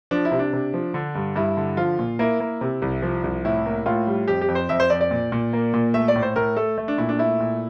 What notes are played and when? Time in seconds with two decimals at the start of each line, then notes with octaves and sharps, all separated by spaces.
0.11 F3 D4
0.25 E4
0.31 C3
0.39 D4
0.53 C3
0.74 F3
0.94 D3
1.15 G2
1.36 G2 E4
1.57 D3
1.77 F3 F4
1.99 A#2
2.19 A#3 E4
2.40 A#3
2.61 C3
2.82 C2
3.02 F3
3.24 C2
3.44 A2 E4
3.65 A#3
3.86 A2 F4
4.07 G3
4.28 F2 G4
4.41 G4
4.49 F2
4.55 C5
4.69 F2 E5
4.80 C5
4.90 F2 D5
5.01 D5
5.11 A#2
5.32 A#2
5.53 A#3
5.74 A#2
5.94 A3 E5
6.08 D5
6.15 A2
6.22 C5
6.36 A2 A#4
6.57 A3 A4
6.78 A3
6.88 D4
6.98 A#2 E4
7.09 D4
7.19 A3 E4
7.40 A#2